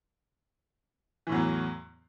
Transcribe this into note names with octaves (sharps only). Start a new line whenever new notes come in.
E2 A2 E3 F#3